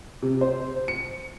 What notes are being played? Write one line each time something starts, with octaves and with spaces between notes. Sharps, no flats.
C3
C5
C#7